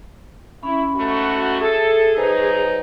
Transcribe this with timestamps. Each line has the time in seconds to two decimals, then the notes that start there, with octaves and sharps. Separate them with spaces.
0.63 C#4 E4 B5
0.95 G#2 A3 F#4
1.60 G#4 A4 E5
2.16 F#3 D#4 B4 C5 G#5